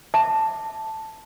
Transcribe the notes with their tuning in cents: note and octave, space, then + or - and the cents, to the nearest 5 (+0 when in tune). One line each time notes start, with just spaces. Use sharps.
E5 +0 A5 +0 D6 +0